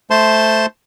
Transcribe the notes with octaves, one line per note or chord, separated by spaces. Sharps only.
A3 C5 A5 C6